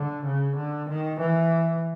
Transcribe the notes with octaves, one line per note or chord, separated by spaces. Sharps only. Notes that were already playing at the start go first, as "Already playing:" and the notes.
Already playing: D3
C#3
D3
D#3
E3